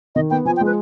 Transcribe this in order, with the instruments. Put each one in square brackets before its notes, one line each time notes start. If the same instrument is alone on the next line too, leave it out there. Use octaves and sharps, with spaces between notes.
[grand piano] D#3 [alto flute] D#5
[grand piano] B3 [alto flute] G5
[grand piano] F3 [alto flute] G#5
[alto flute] G5
[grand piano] G#3
[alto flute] B4